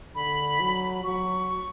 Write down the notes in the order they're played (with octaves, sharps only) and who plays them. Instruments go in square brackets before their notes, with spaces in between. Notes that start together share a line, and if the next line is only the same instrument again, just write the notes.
[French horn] D3 [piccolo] B5
[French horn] F#3
[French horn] F#3 [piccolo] C#6